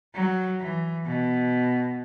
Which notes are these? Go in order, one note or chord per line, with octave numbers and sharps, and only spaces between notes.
F#3
E3
B2